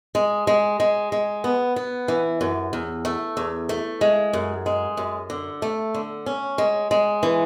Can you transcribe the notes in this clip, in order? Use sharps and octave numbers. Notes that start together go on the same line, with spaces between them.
G#3
G#3
G#3
G#3
B3
B3
E3
F#2
E2
A3
E2
A3
G#3
F#2
G#3
F#2
D3
A3
D3
C#4
G#3
G#3
E3